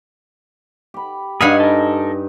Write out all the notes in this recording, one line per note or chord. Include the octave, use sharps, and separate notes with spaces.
G4 B5
G2 D#4 G#4 F5 F#5 G#5 B5
A4 A#4